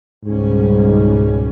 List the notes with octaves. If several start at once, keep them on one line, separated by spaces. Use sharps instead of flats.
C#2 G#2 B2 G3 C#4